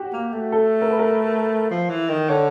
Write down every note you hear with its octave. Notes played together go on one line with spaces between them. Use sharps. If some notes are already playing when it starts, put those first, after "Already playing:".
Already playing: F#4 G4
A#3
A3
A4
A#4
B4
A#4
F3
E3
D#3
D3 C#5